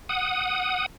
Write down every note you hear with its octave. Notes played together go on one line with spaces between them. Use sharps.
F#5 D#6